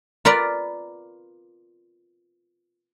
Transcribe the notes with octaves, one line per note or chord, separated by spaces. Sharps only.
F4 A#4 B4 D5 A#5